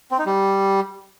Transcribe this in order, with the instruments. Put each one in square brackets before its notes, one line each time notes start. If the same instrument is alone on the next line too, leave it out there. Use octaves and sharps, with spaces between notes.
[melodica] C4
D#4
G3